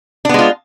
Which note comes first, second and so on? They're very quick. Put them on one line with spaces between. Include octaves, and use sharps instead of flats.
D4 B3 G#3 F4